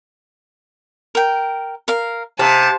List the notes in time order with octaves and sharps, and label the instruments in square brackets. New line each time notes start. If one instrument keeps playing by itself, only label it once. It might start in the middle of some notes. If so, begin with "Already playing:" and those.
[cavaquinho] A#4 G5
A#4 F5
[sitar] C3 [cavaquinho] F5 [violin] A5